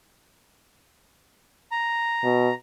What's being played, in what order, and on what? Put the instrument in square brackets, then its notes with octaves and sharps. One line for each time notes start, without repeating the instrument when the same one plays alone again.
[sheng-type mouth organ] A#5
[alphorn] B2